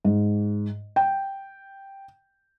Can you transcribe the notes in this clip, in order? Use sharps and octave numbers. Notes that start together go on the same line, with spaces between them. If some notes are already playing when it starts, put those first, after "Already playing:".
G#2
G5